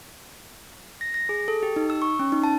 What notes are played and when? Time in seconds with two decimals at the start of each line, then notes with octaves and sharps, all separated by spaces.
1.01 A#6
1.14 A#6
1.29 G#4
1.48 A4
1.63 G4
1.76 D#4
1.90 E6
2.02 C#6
2.19 C#4
2.32 D#4
2.44 A5